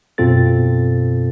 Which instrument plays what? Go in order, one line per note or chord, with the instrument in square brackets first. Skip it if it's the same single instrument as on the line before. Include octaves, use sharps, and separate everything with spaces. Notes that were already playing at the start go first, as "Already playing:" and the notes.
[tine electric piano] F#2 B2 C4 F4 A4 A6